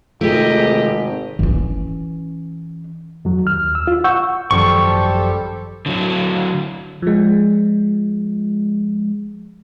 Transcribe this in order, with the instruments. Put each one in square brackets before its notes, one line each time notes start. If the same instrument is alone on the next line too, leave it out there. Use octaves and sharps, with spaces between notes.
[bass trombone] G#1 [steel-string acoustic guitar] C3 A3 [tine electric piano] F4 G#4 [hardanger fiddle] G4 D#5
[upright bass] E3 C#4
[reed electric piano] F2 F#3
D#2 F6
E6
F4
F#5 C#6 E6 G6
[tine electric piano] G#1 F#2 F3 [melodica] G3 G4 C5 [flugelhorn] A4 [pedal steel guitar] C#6
[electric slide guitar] D3 F#3
[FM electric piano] F3 G#3